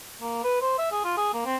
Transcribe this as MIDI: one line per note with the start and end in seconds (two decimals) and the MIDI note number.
0.21 0.41 58
0.44 0.57 71
0.62 0.78 72
0.79 0.90 76
0.92 1.02 68
1.04 1.17 65
1.17 1.32 68
1.33 1.42 58
1.46 1.57 60